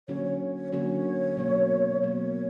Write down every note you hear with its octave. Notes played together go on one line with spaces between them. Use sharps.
D3 F#3 A#3 C#4 F#4 C#5
C#5
C#5
D3 F#3 A#3 C#4 F#4 C#5
B2 F#3 A#3
B2 F#3 A#3 C#5